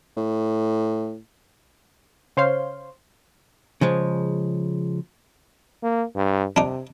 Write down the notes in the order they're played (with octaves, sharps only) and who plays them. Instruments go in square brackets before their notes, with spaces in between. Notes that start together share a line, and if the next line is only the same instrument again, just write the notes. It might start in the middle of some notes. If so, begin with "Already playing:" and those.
[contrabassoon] A2
[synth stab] C#3 C5 C#5 F5 C6
[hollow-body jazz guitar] C#3 F3 G#3
[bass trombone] A#3
G2
[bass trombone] C3 [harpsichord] D4 D#4